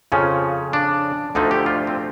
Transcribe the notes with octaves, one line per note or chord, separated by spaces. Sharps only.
F2 C#3 F3 C#4
D4
D2 D3 F3 A3 D#4
G4
F4
C4